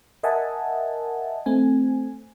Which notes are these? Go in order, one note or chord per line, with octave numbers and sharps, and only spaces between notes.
A#4 D#5 E5 F#5 G#5 A5
A3 C4 G#5